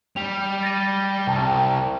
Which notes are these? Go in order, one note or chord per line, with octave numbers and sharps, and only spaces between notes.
G3 F7
A6 A#6 D#7
C2 G5 A5 A#5